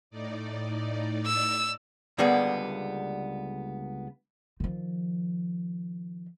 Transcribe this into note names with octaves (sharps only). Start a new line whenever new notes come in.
A2 D#4 D5
E6
C#2 D3 G3 A#3 B3 G#4
D#3 F3